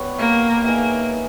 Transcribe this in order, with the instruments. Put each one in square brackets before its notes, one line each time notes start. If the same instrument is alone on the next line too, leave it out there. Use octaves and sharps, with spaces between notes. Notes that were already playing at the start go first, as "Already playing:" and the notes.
Already playing: [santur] G3 B3 G4 C#5
[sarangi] A#3
[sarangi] A#3 [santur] D#4 G#4 B4 E5